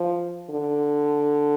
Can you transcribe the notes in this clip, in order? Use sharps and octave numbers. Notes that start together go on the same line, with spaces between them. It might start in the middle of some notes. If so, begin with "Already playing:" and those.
Already playing: F3
D3